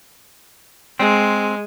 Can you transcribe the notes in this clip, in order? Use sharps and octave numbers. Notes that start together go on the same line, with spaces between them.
G#3 C4